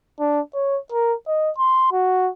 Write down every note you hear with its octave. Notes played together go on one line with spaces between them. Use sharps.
D4
C#5
A#4
D#5
C6
F#4